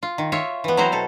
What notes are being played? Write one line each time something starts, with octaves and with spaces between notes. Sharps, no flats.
F4
D#3
F4 C#5 E5
E3 B3
F#3 C4 E4 C5 A#5
B2 A4